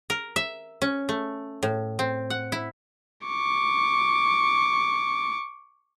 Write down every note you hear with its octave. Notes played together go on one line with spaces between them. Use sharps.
A#4
E5
C#4
A3
A2
C4
F#5
E4
C#6 D6